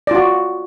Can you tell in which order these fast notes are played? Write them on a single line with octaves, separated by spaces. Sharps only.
D5 F4 F#4